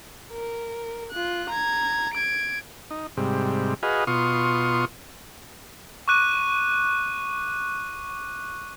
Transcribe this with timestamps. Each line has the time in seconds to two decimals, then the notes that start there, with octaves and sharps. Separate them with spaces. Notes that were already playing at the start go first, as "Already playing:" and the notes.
0.31 A#4
1.12 F4 F#6
1.50 A#5 G#6
2.14 G#6 D7
2.91 D#4
3.17 G#2 C3 G3
3.83 F#4 G#4 B4 D#5 F5
4.07 B2 F4 C6 C#6 D#6
6.08 C#6 D6 F#6 D#7